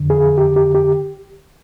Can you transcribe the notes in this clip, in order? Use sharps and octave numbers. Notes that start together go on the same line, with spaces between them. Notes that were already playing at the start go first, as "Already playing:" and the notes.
Already playing: F2 D3
G#4
G4
G4
G4